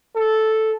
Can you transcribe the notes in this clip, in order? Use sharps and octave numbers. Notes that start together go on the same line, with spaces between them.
A4